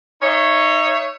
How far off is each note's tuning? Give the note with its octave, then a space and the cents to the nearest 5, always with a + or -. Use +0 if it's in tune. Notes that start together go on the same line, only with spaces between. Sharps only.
D#4 +0 C#5 +0 E5 +30